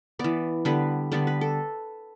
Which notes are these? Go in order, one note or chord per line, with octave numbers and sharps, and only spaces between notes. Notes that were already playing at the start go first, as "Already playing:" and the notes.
E3 B3 D5
D3 G3 B3 B4
D3 G3 B3 D5
B4
A4